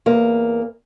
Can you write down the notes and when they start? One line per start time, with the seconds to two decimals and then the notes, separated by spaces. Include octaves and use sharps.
0.06 E2 A#3